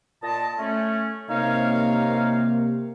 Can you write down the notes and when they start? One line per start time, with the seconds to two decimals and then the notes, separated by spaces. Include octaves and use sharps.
0.23 A#2 D#5 A5
0.59 A3 C#4
1.29 C3 A#3 D#4 C#5 F5